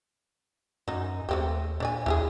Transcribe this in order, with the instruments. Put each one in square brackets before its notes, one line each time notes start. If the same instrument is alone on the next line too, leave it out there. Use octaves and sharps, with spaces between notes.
[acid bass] F#2 [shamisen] F#3 D#4
[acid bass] D#2 [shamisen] A3 C4 G4
[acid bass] A#2 [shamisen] D4 D5 G#5
[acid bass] D#2 [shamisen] E4 G4 G#4